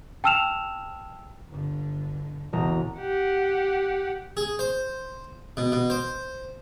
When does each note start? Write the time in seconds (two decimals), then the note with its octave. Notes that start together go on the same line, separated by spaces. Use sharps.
0.24 G5 A5 E6 F6 E7 F7
1.49 G1 D3
2.53 E1 C2 C#3 A#5
3.00 G4 F#5
4.37 G#4
4.59 C5
5.57 B2
5.72 B2
5.90 C5